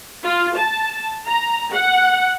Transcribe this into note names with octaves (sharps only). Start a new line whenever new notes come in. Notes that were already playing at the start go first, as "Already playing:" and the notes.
F4
A5
A#5
F#5